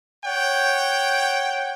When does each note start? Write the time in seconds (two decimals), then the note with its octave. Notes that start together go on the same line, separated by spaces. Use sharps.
0.24 C#5 F#5 G5